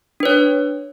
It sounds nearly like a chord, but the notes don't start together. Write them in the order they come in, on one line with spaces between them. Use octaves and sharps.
D4 B4 C#5